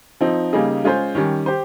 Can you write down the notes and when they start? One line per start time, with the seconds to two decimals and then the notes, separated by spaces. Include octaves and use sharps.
0.21 F3 C4 D#4
0.53 C#3 G3 A#3 D#4 G#4
0.84 G#3 C#4 F4 G#4 C5
1.15 D#3 G3 C#4
1.46 G4 C5